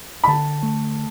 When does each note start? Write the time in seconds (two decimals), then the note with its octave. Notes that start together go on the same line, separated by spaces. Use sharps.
0.24 B5
0.28 D3 A5
0.63 A3